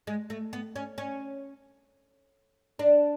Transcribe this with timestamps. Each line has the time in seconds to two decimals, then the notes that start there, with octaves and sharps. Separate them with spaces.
0.07 G#3
0.30 A3
0.53 B3
0.76 C#4
0.98 C#4
2.79 D4